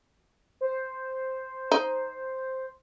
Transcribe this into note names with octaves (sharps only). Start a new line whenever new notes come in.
C5
D#4